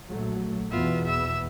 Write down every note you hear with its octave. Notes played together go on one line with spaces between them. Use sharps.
A#1 F#3 A3
E2 B2 B3 F4 E5
E5 E6